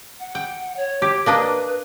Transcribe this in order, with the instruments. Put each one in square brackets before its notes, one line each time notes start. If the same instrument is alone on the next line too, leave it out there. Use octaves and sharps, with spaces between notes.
[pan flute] F#5
[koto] G5
[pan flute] C#5
[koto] G4
[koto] A#3 D4 D#5 [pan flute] B4